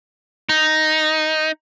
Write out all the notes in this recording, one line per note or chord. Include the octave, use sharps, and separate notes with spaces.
D#4